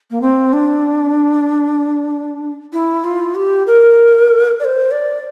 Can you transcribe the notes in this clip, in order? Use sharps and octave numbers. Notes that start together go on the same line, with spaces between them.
A#3
C4
D4
E4
F4
G4
A#4
D5
C5
D5